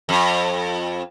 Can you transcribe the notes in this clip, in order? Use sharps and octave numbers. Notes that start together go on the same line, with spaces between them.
F2